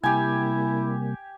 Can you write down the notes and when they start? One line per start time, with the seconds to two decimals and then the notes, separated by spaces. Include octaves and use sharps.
0.03 C3 G3 A#3 E4 G4 G#5